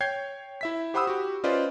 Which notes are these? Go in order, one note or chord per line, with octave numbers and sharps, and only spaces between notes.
C#5 G5 G6 G#6 C7
E4 E5 B6
G4 C5 F#5 B5 D#6 E6
F#4 G4
C#4 F4 B4 C5 D5 D#5